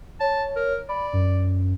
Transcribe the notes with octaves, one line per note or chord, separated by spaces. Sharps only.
C#5 A5
A#4
D5 B5
F#2